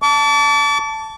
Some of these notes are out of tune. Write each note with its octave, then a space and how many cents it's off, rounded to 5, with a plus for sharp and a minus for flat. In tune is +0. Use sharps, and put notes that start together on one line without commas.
A5 +0 D6 -40